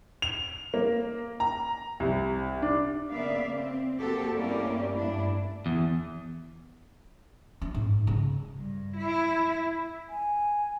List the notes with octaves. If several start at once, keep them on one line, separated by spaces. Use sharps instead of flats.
F7
A#3
A#5
C2
D4
C#3 A#3 B3 D5 E5 F5
C4
A#3 C4 F#4 G4 A4
G2 A#3 C#4 E4 G4 D5
G2 A3 D4 E4
E2
C#4
G#2
C#3
G2
E4
G#5